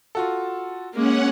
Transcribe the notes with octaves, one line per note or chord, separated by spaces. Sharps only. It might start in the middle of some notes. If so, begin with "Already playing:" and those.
F4 F#4 A4
G#3 A#3 C#4 F#5